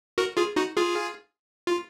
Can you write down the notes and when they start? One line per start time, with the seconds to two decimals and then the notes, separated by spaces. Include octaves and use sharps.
0.18 F#4 A#4
0.37 F4 G#4
0.56 D#4 F#4
0.77 F4 G#4
1.67 F4